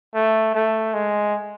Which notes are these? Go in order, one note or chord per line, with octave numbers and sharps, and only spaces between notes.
A3
A3
G#3